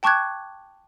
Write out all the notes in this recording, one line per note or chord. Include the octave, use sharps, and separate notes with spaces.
G5 A5 C#6 D6 F#6 G#6